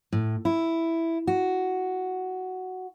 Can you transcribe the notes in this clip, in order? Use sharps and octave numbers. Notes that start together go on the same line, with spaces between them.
A2
E4
F#4